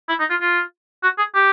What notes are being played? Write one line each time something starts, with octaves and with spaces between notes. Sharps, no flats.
E4
D#4
F4
F4
F#4
G#4
G4